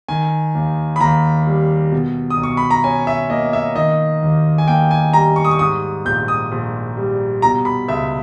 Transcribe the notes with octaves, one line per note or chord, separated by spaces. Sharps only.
D#3 G#5
D#2
B5
D#2 A#5
G3
B2
D#6
B1
C#6
B5
A#5
C#4 G#5
E5
A#3 D#5
E5
D#3 D#5
D#2
G#5
A#3 G5
G#5
G3 A#5
C#6
D#6
C#6
G#2 D#6
A#1 G6
D#6
A#1
G3
B2 A#5
B5
C#2 E5